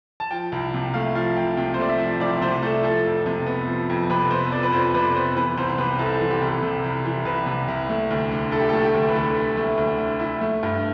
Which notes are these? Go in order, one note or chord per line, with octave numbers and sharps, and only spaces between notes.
A5
F3 G5
C2
C3
A3 F5
F3 F5
C2 G5
C3 G5
C5
A3 D5
E5
F3
C2 D5
C3 C5
A3 A4
F3 A4
F2
C3
B3
F3
F2
C3 B4
B3 C5
F3 D5
B4
F2 C5
C3 B4
B3 C5
E3 B4
C2 C5
C5
C3 B4
C2 A4
A4
E3
G4
C2
A4
C3
C2
E3
C2 B4
C3
C2
A3
D2
D3
E4 A4
G4
A4
A3
G4
D2
B4
D3 A4
E4
A3
D2
D3
E4
A3
G2